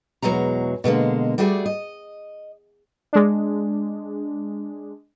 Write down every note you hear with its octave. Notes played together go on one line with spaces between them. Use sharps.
E2 B2 F#3 G#3 A#5
B2 D3 G#3 A#3
G3 A3 F#4 G#4 B4 D5
D#5
G#3 D4